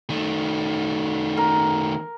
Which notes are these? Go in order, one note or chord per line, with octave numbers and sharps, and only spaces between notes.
D#3 A3
A#4